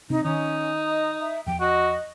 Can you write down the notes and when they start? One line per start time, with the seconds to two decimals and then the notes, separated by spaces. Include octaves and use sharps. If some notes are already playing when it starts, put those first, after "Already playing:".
0.10 C3 C4 D4 D#4
0.25 D#3 C#4 D#4
0.88 D#5
1.20 E5
1.46 E2 F3 G5
1.61 F#4 D#5